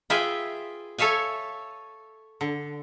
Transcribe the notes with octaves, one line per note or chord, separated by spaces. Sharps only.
F4 G#4 B4 E5 G5 G#5
A4 C#5 E5 F5 G#5
D3